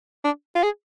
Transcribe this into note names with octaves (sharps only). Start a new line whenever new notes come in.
D4
F4
G#4